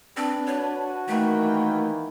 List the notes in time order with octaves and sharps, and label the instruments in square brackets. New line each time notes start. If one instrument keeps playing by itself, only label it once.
[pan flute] C4 [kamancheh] D4 B4
[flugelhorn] F#4 [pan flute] C#5
[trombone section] D#3 E3 A#3 [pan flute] A3 [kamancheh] G5